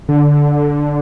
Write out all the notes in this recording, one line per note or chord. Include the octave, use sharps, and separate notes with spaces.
D3